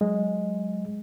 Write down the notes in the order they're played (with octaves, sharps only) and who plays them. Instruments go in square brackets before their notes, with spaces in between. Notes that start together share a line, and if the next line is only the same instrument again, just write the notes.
[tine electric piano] F#3 G#3